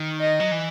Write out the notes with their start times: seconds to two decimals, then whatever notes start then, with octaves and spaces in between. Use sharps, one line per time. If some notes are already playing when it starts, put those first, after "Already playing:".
Already playing: D#3
0.21 D#5
0.40 F#3
0.52 E3